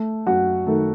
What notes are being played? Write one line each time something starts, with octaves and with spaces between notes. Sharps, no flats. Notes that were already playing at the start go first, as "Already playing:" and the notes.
Already playing: A3
F#2 F#4 F#5
D#3 A3 A4